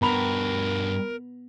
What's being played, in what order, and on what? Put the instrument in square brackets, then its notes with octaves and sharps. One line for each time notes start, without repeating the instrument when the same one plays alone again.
[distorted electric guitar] G2 F#4 [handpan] B3 [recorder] A#4 [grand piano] A#5 B5 F7